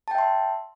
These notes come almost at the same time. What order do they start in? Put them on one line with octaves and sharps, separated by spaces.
A5 G5 E5 C6